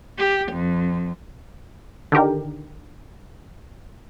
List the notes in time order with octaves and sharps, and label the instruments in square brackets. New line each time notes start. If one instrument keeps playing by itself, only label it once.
[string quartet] G4
F2
[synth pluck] D3 D#3 G4 A#4